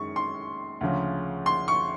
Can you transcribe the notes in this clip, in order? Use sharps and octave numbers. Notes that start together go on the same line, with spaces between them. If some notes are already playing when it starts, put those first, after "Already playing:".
Already playing: F#2 D#3 G#3 C#6
C6
D2 C#3 F3
C6
C#6